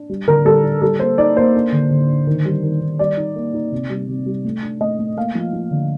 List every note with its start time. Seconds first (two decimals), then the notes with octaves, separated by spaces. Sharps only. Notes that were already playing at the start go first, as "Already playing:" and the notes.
Already playing: D4
0.09 G3
0.28 D3 A#4
0.45 G3 A4
0.64 D4
0.82 G3 A4
1.00 A#3 C5
1.18 D#4 D5
1.36 A#3 C5
1.54 D4
1.72 D3
1.91 D3
2.09 D4
2.27 D#3
2.45 G3
2.63 D#3
2.81 D#3
2.99 G3 D5
3.17 D#4
3.36 A#3
3.54 D#4
3.72 C3
3.90 G3
4.08 C3
4.26 G3
4.45 A3
4.62 D4
4.81 A3 D#5
4.99 A3
5.17 A#3 F5
5.35 F3
5.53 F3
5.71 D3